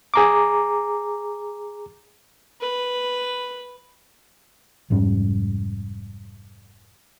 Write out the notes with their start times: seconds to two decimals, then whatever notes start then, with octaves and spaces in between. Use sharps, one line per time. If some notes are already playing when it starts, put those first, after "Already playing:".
0.14 G#4 A#5 D6
2.61 B4
4.90 F1 G#2 G3 C#4